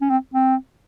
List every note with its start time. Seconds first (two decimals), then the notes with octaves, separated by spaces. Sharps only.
0.01 C#4
0.10 C4
0.34 C4